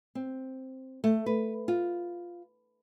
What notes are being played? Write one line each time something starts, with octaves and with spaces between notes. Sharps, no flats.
C4
A3
B4
F4